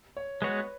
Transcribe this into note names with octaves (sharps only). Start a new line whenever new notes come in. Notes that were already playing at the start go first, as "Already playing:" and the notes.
C#5
G#3 B3 F#4 B4 C#5